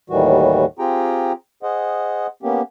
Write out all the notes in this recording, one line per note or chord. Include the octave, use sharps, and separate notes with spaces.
D#2 A2 D#3 E3 G3 F#4
C4 F4 G4 G#4 G5 A#5
G#4 C5 D#5 F#5
A#3 B3 C#4 G4